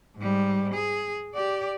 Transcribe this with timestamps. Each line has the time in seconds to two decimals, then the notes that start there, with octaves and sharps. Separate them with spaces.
0.17 G#2 G3
0.74 G#4
1.34 G4 D5